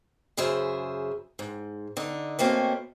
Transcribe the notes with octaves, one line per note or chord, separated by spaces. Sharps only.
F#2 C#3 G#4 C5 E5
G#2
D3 D#4
B2 A3 A#3 C4 C#4